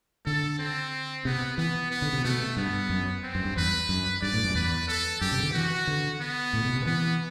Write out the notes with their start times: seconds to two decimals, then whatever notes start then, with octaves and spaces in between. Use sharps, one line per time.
0.26 D3 A4
0.59 C4
1.25 C3 B3
1.58 E3 B3
1.91 B3
2.02 D3
2.13 C3
2.24 B2 A3
2.57 G2 B3
2.90 F#2
3.23 C4
3.35 F#2
3.45 G2
3.57 E2 B4
3.89 F#2
4.22 G2 D5
4.33 A2
4.44 F#2
4.55 E2 B4
4.88 A4
5.21 F#2 G4
5.32 C3
5.43 D3
5.54 E3 F#4
5.87 D3
6.21 B3
6.53 A2
6.65 B2
6.76 C3
6.86 E3 B3